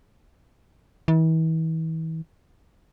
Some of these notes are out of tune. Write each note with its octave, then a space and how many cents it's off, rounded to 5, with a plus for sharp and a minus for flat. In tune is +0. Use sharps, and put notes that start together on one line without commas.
E3 -40